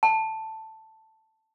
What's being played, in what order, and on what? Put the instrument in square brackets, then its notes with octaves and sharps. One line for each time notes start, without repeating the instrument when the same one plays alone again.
[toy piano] A5